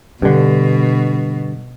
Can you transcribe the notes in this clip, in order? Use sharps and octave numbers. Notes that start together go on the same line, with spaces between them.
G2 B2 D3